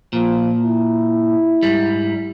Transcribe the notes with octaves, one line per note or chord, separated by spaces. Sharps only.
A#2 F3
E4
G#2 G3